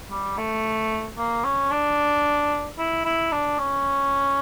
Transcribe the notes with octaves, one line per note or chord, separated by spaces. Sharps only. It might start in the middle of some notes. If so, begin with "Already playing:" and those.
G3
A3
A#3
C#4
D4
E4
E4
D4
C#4